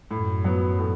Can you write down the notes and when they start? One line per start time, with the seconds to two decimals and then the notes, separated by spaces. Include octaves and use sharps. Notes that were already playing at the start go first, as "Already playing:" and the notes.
0.11 F#2 A2
0.44 F#3 B3
0.79 A2